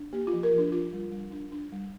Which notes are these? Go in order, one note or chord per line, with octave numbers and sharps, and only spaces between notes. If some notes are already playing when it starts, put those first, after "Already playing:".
Already playing: D4
A#3 G4
F4
F3
A#4
F3 D4
D4 F4
G3
G3
D4
D4
G3